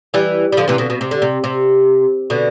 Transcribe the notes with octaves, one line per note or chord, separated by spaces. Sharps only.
E3 G3
G3
D3 F3
C3 E3
B2 D3
B2
C3
D3
C3
C3
B2 D3